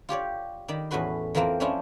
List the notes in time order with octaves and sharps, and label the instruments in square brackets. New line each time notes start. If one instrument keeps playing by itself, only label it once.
[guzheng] F4 G4 C#5 D5
D#3 D5 B5
E2 A2 C#4 F#4 B4 C6
F2 E3 F3 A#3 C4 F5
F3 A3 C#4 D4 E4 F4